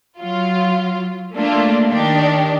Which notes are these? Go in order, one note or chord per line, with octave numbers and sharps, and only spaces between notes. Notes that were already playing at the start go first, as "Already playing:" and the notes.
F#3 F4
A3 A#3 D4 F4
D#3 D4 G4